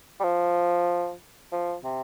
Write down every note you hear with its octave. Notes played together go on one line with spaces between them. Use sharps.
G3
F3
F3
C3